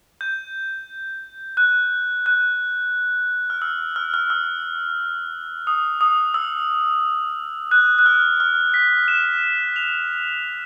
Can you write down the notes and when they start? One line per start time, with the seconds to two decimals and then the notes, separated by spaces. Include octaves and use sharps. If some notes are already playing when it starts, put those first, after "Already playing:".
0.21 G6
1.57 F#6
2.26 F#6
3.50 F6
3.62 E6
3.96 F6
4.14 F6
4.30 E6
5.67 D#6
6.01 D#6
6.34 E6
7.71 F#6
7.99 F#6
8.06 F6
8.40 F6
8.74 B6
9.08 E7
9.76 F7